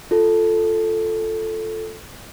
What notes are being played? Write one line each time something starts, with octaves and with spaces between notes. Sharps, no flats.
F4 A4